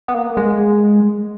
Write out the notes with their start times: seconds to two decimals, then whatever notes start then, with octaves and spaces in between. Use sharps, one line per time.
0.08 B3
0.14 A#3
0.37 G#3